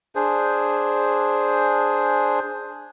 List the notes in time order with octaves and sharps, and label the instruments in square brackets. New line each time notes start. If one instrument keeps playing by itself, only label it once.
[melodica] D4 G#4 C5